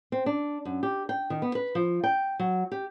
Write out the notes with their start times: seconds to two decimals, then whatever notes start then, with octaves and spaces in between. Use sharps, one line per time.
0.12 C4
0.26 D4
0.65 F#2
0.83 G4
1.09 G5
1.30 D#3
1.42 B3
1.55 B4
1.75 F3
2.04 G5
2.39 F#3
2.72 G4